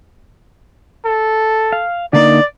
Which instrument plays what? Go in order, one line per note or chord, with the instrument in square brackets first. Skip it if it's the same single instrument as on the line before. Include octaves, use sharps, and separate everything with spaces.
[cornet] A4
[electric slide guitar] F5
[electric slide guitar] D3 A#3 D#4 [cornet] D5